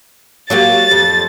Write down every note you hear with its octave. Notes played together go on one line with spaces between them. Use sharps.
F#3 A#3 G4 A6
F2